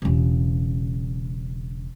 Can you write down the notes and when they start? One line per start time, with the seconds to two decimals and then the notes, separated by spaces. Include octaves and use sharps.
0.02 E1 C#3